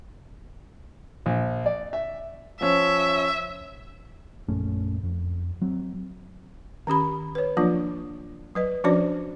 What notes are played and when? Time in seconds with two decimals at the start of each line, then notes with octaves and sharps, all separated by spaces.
1.26 A#1
1.66 D5
1.93 E5
2.61 F3 C#4 E5
4.49 A#1 F#2 A3 C#4
5.03 F2
5.62 F#3 C4
6.87 D#3 C#4 G4 B5
7.35 B4 C#5
7.57 F3 F#3 A#3 D4 F4
8.55 F#3 B4 D#5
8.84 F3 C#4 D4 F#4 C5 D5